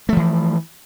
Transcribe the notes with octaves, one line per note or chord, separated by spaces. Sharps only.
E3 F3 A3